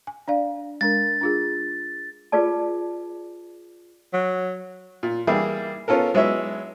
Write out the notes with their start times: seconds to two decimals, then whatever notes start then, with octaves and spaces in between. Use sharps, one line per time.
0.07 G#5
0.28 D4 D5 F5
0.81 G#3 D4 A#4 A6
1.21 D4 F4 G#4
2.32 F4 G#4 B4 D5 A5
4.13 F#3
5.03 A#2
5.27 E3 G3 A#3 E4 G#4
5.88 B3 C#4 F4 A4 A#4
6.14 F#3 G#3 B3 E4 C#5 E5